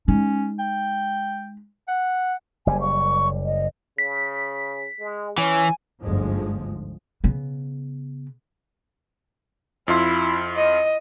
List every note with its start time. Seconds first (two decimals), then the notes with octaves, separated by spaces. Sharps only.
0.08 G#3 C#4 D#4
0.59 G5
1.88 F#5
2.67 F#1 G3 G#5
2.81 C#6
3.44 D#5
3.98 C#3 B6
4.99 G#3
5.38 E3 C#4 G#5
6.01 G1 D2 G#2 D3 F3 G#3
7.24 C#3 B3
9.88 F2 E4 F4 C6
10.56 D#5